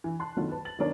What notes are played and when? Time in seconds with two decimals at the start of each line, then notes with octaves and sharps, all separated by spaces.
0.04 E3
0.19 A5 C6 F#6
0.37 D#3 F#3 A3 B3 F4
0.51 B4 A5
0.65 A6 F#7
0.79 D#3 F#3 B3 D4 A#4 C#5